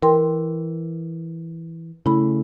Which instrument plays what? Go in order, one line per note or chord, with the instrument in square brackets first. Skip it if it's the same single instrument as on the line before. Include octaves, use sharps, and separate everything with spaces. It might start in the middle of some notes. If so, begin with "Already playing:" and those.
[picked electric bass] E3 [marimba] A#4 G5 C6
[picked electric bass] C#3 A3 [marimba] E4 B5